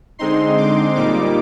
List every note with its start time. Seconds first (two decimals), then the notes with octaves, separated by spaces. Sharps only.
0.19 D3 G#3 C4 D#4 C6
0.58 D6
0.95 A#2 G3 A#3 D#4 D6